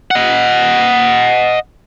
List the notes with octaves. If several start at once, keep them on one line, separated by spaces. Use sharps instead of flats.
D#5 F#5